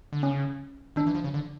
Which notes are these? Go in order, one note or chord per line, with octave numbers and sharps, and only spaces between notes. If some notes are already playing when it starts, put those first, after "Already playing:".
D3
C#3 C#4
D#3 D4
E3
F3
C#3
D3